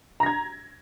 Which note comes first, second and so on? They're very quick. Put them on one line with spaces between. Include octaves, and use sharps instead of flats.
A#5 A#6 G#6